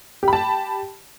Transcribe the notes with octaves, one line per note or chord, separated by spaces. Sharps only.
G4 A5 B5